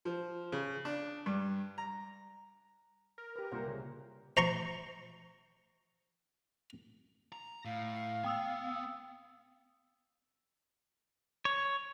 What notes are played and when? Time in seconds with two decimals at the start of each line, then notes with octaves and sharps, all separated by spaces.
0.05 F3
0.52 C#3
0.85 D4
1.26 G2
1.78 A#5
3.18 A#4
3.36 G4 B4
3.51 C2 A#2 A#3 C5 F#5
3.67 C#3
4.37 C5 A#5 C6 C#6
7.32 A#5
7.65 A2 F5
8.24 B3 G5 D#6 E6
11.45 C#5